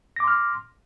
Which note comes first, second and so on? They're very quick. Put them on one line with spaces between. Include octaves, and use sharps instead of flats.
A#6 D6 C6 F6